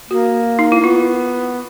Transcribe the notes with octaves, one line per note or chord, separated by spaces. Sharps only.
A#3 F#4
D#4
E4
A#3
B3 F4